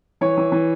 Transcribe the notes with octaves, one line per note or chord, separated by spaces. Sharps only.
E3 C#5
E3
E3